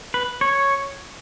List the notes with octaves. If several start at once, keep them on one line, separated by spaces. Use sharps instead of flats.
B4
C#5